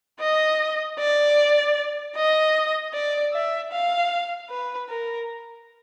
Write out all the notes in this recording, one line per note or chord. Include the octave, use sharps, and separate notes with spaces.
D#5
D5
D#5
D5
E5
F5
B4
A#4